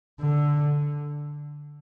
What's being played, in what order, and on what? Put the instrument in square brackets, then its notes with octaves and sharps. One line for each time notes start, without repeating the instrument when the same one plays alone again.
[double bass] D3